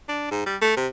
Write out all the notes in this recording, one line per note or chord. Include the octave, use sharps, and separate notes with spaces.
D4
G#2
G3
A3
C3